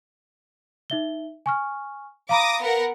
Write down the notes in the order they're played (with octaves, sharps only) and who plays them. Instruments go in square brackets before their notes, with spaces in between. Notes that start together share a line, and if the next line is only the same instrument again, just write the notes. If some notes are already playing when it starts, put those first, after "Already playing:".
[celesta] D#4 E5 G7
G#5 C#6 F6
[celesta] F5 A#5 B5 [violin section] D6 D#6 A#6
[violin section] B3 A#4 F#5